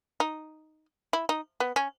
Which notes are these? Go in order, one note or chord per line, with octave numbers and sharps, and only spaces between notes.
D#4
E4
D#4
B3
C#4